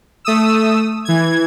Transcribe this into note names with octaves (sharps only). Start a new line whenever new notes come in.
A3 D#6 E6
E3 G#6